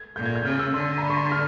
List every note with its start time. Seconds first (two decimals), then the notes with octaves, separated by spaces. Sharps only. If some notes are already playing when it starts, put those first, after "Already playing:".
Already playing: G#6
0.16 A#2 G6
0.26 G#6
0.35 G6
0.45 C#3 F6
0.59 E6
0.74 D3 C6
0.98 A#5
1.02 B5
1.10 C#6
1.17 C6
1.32 F6